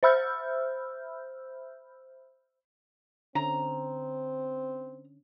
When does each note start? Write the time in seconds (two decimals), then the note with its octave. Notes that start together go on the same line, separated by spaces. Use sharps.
0.03 C5 E5 B5 E6 F6 G6
3.35 D3 C4 C#4 A#5